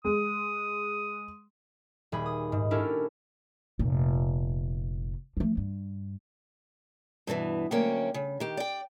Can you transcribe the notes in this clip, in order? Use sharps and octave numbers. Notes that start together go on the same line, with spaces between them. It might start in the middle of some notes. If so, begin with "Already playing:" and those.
G#3 D#6
D#1 G#4 B5
D#6
G#2
C#4 D4 E4 G4 A4 A#4
F1 A#2
F3 A3
G2
G2 B2 D#3 E3
D2 F#3 A#3 C#4 G5
C#3
D#3 G4
D5 G5